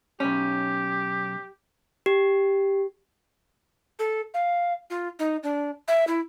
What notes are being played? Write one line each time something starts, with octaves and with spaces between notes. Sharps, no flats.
B1 C#4 G4
G4
A4
F5
F4
D#4
D4
E5
E4